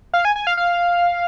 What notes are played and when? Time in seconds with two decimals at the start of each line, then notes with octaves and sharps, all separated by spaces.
0.14 F5
0.25 G#5
0.36 G#5
0.47 F5
0.57 F5